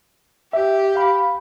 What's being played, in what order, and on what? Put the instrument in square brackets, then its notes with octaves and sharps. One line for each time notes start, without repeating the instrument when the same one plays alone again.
[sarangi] G4 [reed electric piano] E5
[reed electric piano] F5 B5